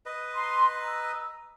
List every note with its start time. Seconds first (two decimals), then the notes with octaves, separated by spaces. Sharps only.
0.06 B4 D#5
0.35 A#5 C6
0.80 A#5 E6